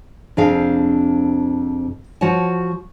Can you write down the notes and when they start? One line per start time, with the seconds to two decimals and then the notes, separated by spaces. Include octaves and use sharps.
0.37 F2 C3 D4 G#4 F5
2.21 F3 F#4 C#5 F#5 A5